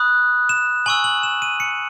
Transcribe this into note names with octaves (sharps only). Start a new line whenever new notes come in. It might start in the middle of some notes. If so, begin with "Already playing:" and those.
Already playing: B5 D#6 F#6
E7
G#5 C#6 E6 F#7
F#7
E7
D#7
C#7